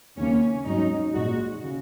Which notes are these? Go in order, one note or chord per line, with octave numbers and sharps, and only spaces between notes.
D#2 C#3 A#3 C#4
G#2 F#3 C#4 D#4
A#1 G#2 G#3 D#4 F#4
C#3